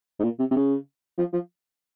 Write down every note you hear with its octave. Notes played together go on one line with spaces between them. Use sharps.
G#2
A#2
C3
C3
C#3
F3
F3